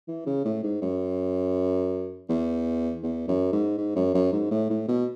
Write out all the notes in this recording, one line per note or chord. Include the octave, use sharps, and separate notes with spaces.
E3
C#3
A2
G#2
F#2
E2
E2
F#2
G#2
G#2
F#2
F#2
G#2
A2
A2
B2